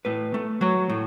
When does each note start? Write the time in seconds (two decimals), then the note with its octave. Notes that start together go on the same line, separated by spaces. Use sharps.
0.05 A2 B4
0.34 A3
0.61 F#3 C#5
0.90 A2